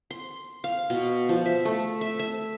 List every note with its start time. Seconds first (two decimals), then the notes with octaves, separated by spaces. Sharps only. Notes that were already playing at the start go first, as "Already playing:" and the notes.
0.11 C6
0.64 F5
0.90 B2
1.29 F3
1.46 E5
1.65 A3
2.01 E5
2.19 E5